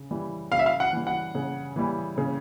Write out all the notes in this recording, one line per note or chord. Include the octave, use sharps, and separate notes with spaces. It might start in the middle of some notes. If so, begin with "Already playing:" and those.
Already playing: C#3
E3 G3
C#3 F5
E5
F5
F#5
E3 G3
F#5
C#3
E3 G3
C#3